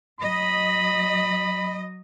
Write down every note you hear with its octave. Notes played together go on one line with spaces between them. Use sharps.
F#3 D#5 B5